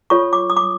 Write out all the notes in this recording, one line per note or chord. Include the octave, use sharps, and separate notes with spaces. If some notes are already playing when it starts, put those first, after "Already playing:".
F4 A4 C#5 C#6
D6
D#6
D6